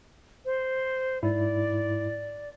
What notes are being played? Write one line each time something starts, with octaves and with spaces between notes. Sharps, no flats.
C5
G#2 E4 D5